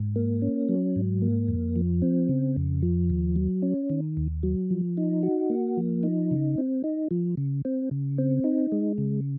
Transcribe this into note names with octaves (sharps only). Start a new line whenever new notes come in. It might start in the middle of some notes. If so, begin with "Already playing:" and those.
Already playing: G#2
A#3
C#4
F#3
G#2
A#3
F2
F3
C4
C#3
F2
F3
D#2
F#3
C#4
D#3
D#2
F#3
F3
D#4
F#4
A#3
F3
D#4
C#3
C4
D#4
F3
C#3
C4
C#3
C4
D#4
G#3
C#3